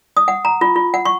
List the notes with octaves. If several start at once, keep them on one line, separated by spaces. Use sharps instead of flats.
D#6
F#5
A#5
F4
F4
F#5
C#6